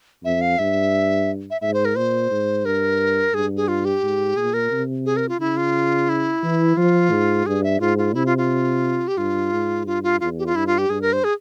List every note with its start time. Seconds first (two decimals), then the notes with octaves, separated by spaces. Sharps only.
0.24 F2 E5
0.41 F5
0.59 G2 E5
1.50 E5
1.61 G#2 E5
1.74 C5
1.85 A#4
1.96 A#2 C5
2.31 G#2
2.65 G2 A#4
3.34 G2 G#4
3.57 G#4
3.68 F4
3.85 G4
4.03 G#2
4.37 A#2 G#4
4.54 A#4
4.71 C3
5.06 G#4
5.17 A#4
5.29 F4
5.40 C#3 E4
5.57 F4
6.09 E4
6.43 E3
6.77 F3 F4
7.11 G#2
7.46 G2 G#4
7.64 E5
7.80 G#2 F4
7.98 F4
8.14 C3 E4
8.26 F4
8.38 F4
9.08 G4
9.17 G2 F4
9.52 G#2
9.86 G2 F4
10.03 F4
10.20 E2 F4
10.38 G4
10.46 F4
10.56 G2 E4
10.67 F4
10.78 G4
10.89 G2 G#4
11.01 A#4
11.13 C5
11.24 G#4